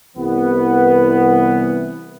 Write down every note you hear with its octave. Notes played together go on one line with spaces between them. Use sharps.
C2 E3 B3